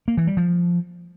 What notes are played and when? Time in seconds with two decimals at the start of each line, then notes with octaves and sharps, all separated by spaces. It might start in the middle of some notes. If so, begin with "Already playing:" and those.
0.08 A#3
0.17 E3
0.27 G3
0.37 F3